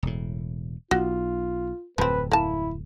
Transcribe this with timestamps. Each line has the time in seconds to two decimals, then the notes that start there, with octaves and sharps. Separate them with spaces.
0.03 E1 A2
0.91 B1 F4 F#4
1.98 D1 F2 F3 C4 B4
2.31 A#3 E4 A5